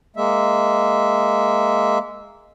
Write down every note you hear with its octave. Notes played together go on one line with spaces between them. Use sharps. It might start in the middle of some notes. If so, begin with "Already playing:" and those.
G#3 A#3 E5